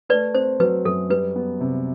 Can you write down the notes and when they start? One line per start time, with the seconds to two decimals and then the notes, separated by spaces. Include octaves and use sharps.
0.09 A3 B4 D5
0.34 C4 C5
0.60 F#3 B4
0.85 F#2 A4
1.10 G3 B4
1.36 B3
1.61 C3